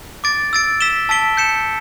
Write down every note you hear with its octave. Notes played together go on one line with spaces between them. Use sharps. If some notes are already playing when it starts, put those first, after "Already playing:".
D6 A6 D7
E6 A6 D7
E6 B6 E7 G7
A5 E6 B6 D7 G7
G6 C#7 E7